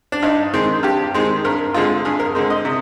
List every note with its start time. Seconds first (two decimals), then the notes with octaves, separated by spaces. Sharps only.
0.12 D4
0.22 G2 D#4
0.54 D#3 G#3 C4
0.83 G2 G4
1.14 D#3 G#3 C4
1.45 G2 A#4
1.74 D3 G#3 C4 F4
2.05 G2 G#4
2.20 A#4
2.35 D3 G#3 C4
2.50 D#5
2.65 C3